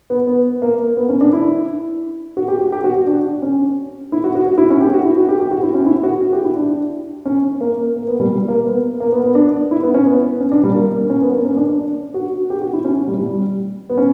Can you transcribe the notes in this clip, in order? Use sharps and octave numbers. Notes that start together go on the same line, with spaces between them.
B3
B3
A#3
B3
C#4
D4
E4
F#4
G4
G4
G4
F#4
F#4
D4
C#4
E4
F#4
F#4
F#4
E4
C#4
G4
F#4
E4
F#4
G4
G4
F#4
E4
C#4
E4
F#4
F#4
G4
E4
D4
C#4
A#3
A#3
B3
G3
G3
A#3
B3
A#3
B3
B3
D4
E4
B3
C#4
B3
C#4
D4
G3
A#3
C#4
B3
A#3
C#4
D4
D4
F#4
G4
F#4
E4
C#4
G3
G3
B3
C#4